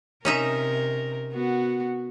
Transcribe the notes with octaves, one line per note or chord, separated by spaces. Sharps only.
C3 C#4 D#4 A#4 E5
B3 F#4